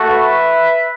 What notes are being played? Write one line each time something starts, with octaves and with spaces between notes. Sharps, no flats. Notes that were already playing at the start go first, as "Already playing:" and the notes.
Already playing: A3 F#4
B4 E5